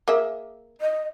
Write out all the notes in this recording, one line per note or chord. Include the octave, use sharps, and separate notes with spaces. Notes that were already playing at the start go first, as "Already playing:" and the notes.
A#3 G#4 E5
D#5